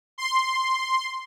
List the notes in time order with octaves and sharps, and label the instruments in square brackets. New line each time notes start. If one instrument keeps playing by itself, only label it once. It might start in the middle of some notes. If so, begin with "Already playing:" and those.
[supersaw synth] C6